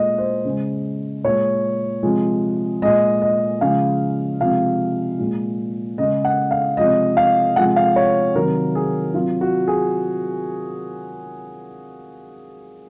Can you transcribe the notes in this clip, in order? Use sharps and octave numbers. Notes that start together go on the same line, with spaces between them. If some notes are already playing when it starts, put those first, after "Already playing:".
Already playing: A#2 G#3 D#5
C5
C#3 G#3
A#2 G#3 C#5
C3 F3 G#3
A#2 G#3 D#5
D#5
C#3 F3 G#3 F5
C3 F3 G#3 F5
A#2 G#3
C#3 G#3 D#5
F#5
F5
C3 F3 G#3 D#5
F5
C3 F3 G#3 F#5
F5
C#5
C3 D#3 F#3 A#4
G#4
C3 F#3 F4
F#4
G#4